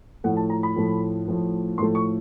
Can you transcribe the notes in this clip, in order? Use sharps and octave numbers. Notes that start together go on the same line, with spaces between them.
A2 F3 A3 F#5
A5
A#5
B5
A2 F3 A3
A2 F3 A3
A2 F3 A3 C6
C#6